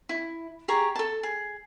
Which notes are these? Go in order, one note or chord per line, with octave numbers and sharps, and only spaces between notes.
E4
G4 G#4 A#5 C#6
A4 A5
G#4